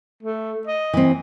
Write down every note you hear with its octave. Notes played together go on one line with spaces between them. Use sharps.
A3
D#5
E3 C4